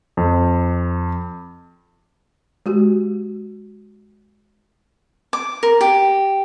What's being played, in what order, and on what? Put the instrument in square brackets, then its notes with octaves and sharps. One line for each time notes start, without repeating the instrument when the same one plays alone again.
[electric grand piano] F2
[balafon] G#3 F#4 G4
[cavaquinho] D6
A#4
G4